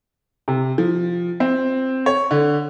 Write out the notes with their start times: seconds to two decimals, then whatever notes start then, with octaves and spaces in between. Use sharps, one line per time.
0.48 C3
0.78 F3
1.40 C4
2.06 C#5
2.31 D3